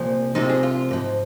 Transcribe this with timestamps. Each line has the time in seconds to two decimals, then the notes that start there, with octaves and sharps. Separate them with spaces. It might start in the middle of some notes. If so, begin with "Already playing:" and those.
Already playing: C2 A#2 F3
0.35 C2 C3 F3 D#4
0.49 G#4
0.63 F4
0.91 G#2 F3